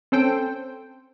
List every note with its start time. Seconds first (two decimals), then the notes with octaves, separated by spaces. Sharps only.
0.12 C4 C#4 A4 C5 G5